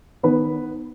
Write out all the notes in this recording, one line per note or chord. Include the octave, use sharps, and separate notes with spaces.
D#3 B3 B4